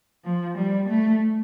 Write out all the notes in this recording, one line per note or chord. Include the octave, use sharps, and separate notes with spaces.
F3
G3
A3